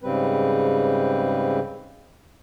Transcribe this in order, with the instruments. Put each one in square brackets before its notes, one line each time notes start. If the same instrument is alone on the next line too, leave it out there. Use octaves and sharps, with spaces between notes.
[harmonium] G#2 C#3 G3 C4 B4